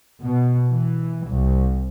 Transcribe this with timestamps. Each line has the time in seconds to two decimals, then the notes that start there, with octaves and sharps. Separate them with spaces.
0.23 B2
0.71 E3
1.26 C2